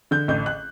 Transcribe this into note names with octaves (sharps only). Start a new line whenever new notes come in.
D3 G6
A1 G6
F#6